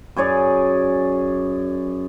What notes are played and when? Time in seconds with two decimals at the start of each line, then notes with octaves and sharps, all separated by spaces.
0.16 F#2 G#4 C#5 D5